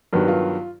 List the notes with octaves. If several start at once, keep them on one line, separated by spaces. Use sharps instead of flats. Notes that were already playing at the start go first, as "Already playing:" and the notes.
G2 D#3 F#3 B3
F4